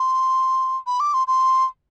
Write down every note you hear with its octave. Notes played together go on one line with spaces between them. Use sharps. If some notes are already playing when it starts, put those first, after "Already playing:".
Already playing: C6
B5
D6
C6
C6